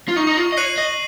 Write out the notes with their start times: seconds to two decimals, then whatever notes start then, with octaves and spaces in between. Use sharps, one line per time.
0.08 F4
0.16 D#4 C#6
0.27 D#4
0.37 F4
0.52 D#5
0.57 C#5 F#6 C7 D#7 F#7
0.78 D#5